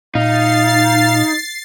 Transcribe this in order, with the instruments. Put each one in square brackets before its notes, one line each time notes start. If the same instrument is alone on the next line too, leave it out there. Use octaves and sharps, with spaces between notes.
[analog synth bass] A#2 [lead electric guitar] D#4 [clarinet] F5 [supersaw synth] A6 C7